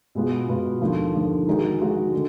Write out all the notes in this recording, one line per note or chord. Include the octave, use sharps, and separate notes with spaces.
B2 G#3 B3 F4
B2 G#3 B3 F4
D#2 D3 F3
D#2 D3 F3
D#3 G#3 D#4 F#4
D#3 G#3 D#4 F#4
D3